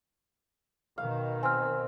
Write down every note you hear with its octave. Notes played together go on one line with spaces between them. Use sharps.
B2 D#3 F5
C4 G#5 F6